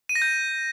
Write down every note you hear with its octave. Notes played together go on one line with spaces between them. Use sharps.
D#7
A#6
G6